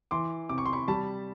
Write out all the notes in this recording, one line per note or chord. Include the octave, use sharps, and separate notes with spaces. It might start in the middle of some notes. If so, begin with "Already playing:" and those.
E3 C6 D6
C3 D6
C#6
C6
B5 C#6
G3 A5 B5